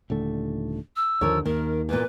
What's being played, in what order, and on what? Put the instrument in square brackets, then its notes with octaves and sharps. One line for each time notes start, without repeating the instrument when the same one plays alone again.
[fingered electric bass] D#1 D3 A3
[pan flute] E6
[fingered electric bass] D#2 D3 [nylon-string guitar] F3 A#4 C#5
[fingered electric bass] D#2 A#3 [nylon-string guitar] D#3 [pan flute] A#4
[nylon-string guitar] E2 A#2 [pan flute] B4